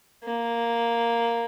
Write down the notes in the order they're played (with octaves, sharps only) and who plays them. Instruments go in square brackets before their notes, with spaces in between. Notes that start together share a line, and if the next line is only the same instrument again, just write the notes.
[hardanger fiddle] A#3